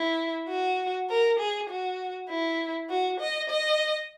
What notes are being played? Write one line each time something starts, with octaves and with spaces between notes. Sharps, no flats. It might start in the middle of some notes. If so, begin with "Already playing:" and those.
Already playing: E4
F#4
A#4
G#4
F#4
E4
F#4
D#5
D#5